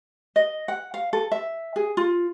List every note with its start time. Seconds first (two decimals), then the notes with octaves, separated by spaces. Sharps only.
0.36 D#5
0.68 F#5
0.94 F5
1.13 A4
1.32 E5
1.76 G#4
1.97 F4